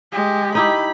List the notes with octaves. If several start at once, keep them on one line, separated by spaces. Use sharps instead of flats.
G#3 G4
D#4 E4 G4 B5